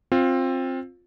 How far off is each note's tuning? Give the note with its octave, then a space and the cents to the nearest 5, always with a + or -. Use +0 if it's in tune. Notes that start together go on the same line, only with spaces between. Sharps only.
C4 +15 F4 +15